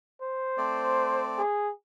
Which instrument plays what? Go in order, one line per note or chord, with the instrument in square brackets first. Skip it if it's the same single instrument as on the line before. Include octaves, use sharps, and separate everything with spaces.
[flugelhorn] C5
[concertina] A3 C4 D5
[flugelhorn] G#4